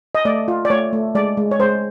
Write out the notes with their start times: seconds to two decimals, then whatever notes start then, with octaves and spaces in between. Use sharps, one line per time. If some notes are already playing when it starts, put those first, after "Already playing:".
0.15 D#5
0.25 A3 D5
0.48 F4
0.65 D5
0.70 A3 C#5
0.93 A3
1.15 G#3 D5
1.37 G#3
1.51 C#5
1.59 G#3 C5